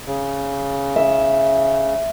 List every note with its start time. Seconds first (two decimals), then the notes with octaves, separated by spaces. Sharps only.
0.07 C#3
0.96 E5